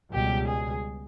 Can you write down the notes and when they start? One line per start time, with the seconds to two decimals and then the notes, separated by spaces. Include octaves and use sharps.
0.11 C#2 B2 G3 G4
0.47 G#4